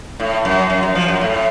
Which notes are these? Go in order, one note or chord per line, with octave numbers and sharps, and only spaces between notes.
A2
F#2
F#2
F#2
F3
F#2
A2